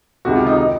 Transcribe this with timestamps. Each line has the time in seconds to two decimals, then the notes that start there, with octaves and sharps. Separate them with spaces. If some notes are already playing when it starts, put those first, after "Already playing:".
0.25 C#2 C3 D#3 F#4
0.36 F4
0.47 D#4
0.57 D#3 D#4